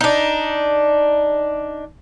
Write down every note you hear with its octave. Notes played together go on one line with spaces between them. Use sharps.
D4 D#4